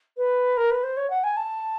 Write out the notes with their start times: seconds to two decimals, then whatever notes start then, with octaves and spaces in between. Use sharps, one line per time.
0.17 B4
0.57 A#4
0.71 B4
0.83 C5
0.97 C#5
1.10 F#5
1.24 G#5
1.37 A5